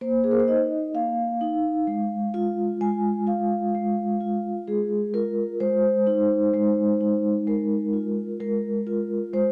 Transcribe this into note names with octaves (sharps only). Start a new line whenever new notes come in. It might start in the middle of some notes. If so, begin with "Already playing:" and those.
A#3 C5
G#4
A#4
C5
D#4 D#5
A#3 F5
D#4
G#3
F4
G#3 G#5
F4 F5
G#3
F4
G#3 G#4
F4 A#4
G#3 C5
D#4
G#3
D#4
G#3 A#4
F4
G#3 A#4
F4
G#3 C5